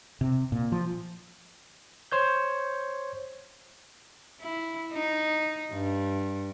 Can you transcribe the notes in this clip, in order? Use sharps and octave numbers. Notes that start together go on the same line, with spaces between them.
C3
A#2
F3
C5 C#5 G6
E4
D#4
G2